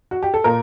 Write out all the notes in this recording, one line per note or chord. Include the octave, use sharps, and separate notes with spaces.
F#4
G4
A4
A#2 A#4